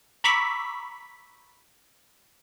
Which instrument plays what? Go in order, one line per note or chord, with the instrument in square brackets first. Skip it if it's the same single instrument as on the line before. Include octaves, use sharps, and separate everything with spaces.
[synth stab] A#5 B5 C#6 D6 E6 B6